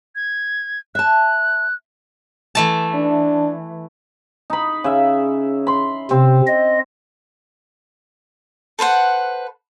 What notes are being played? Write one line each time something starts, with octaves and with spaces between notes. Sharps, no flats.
G#6
E5 A5 F#6
E3 A3 A5
D4
D#4 B5
C#3 E5
B5 C6
C3 C4
D#5
A4 B4 C5 F#5